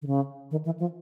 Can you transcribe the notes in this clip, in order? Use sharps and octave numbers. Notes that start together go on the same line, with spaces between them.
D3
C#3
D#3
E3
F3